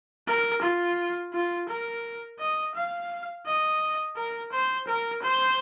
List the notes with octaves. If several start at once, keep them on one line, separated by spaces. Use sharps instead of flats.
A#4
F4
F4
A#4
D#5
F5
D#5
A#4
C5
A#4
C5